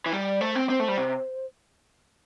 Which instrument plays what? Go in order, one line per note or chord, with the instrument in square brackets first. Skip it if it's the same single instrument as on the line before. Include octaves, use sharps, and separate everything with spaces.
[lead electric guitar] E3
[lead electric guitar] G3 [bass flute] D5
[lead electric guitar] A3 [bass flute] C5
[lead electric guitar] C4
[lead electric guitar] C4 [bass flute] C5
[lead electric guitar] A3
G3
C3